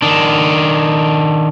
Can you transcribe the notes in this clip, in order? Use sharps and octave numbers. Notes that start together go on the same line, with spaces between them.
D#3 D4